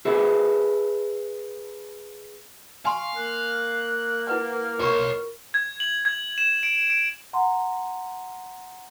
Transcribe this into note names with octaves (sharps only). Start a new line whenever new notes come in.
G#4 A4 B4 E5
F5 G#5 C6 C#6
A#3 F#6
E4 B4 F#5 F6
F4 A#4 C#5 C6 C#6
G#6
F#7
G#6
E7
D7
D7
F#5 A#5 C6